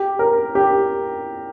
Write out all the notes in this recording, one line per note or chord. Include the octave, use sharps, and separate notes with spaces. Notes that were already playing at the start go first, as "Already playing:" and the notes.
Already playing: G4
A#4
G4